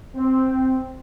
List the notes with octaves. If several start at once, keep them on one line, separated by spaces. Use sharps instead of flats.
C4